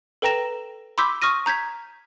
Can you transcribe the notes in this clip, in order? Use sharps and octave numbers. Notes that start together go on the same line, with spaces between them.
A4 B4 G5 A#5 A#6 E7
B5 C6 D6 E6 G6 B6
C#6 D#6 F6 A#6 D#7
A#5 G6 G#6 B6